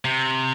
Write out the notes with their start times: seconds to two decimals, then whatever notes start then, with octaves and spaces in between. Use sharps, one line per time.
0.05 C3